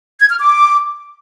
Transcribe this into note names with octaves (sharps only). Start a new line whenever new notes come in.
G#6
F6
D6